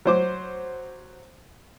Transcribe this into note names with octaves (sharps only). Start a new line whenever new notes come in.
F#3 C5 D6